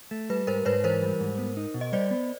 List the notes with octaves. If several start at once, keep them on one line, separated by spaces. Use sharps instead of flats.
A3
G3 B4
G#2 A#4 C5
G#2 B4 C#5
E3 A#4 C5
G3
G#2
B3
D#4
B2
D#5
G3 C5 D5
B3